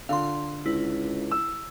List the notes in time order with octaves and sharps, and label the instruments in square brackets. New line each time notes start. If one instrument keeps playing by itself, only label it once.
[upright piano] D3 F4 [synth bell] F5 C6
[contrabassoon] C#2 [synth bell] E4
[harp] E6